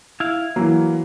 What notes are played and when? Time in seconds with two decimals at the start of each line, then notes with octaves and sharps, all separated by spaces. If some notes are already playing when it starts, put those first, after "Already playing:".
0.20 E4 F5
0.56 E3 F#3 A#3